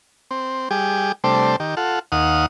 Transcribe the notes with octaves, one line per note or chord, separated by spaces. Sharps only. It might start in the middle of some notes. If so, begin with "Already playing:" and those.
C4
G3 G4 G#4
C3 G3 A3 D4 C5
D#3 G4
F4 A4 F#5
D#2 F5 F#5 D#6